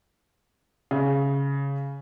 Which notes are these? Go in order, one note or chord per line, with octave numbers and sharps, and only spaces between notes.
C#3